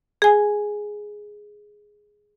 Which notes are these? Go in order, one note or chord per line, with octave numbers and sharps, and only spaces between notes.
G#4 G#5